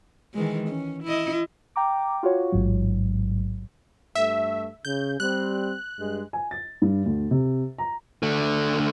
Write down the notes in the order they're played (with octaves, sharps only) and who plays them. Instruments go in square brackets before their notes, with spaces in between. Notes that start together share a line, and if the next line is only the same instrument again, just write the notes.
[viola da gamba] D#3 E3 G#3
C#4
E4 D#5
[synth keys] G5 A#5 D6
F4 F#4 C#5
A1 G#2 F#3
[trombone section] G2 A3 [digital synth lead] E5
[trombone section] C#3 [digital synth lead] G6
[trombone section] G3 C4 [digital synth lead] F#6
[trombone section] G2 G#3
[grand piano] G#5
A6
G2
D2
C3
A#5
[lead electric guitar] D3 A3